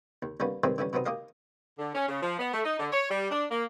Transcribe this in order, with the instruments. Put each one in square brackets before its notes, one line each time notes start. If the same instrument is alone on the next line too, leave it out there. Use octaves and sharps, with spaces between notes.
[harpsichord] D#2
D#2 G3 A#3 B3 C#4
C3 D#3 E3 G3 G#3 C4
D3 E3 G3 C#4
C3 F#3 B3 C4 D#4
A#3 D#4 G4 A#4 D#5 F5
[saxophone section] D3
C#4
C#3
F3
B3
A3
D#4
D3
C#5
G3
D4
A#3